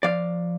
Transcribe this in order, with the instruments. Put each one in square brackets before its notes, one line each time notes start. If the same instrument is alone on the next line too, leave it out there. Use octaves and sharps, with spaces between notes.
[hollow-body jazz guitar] F3 D5 F5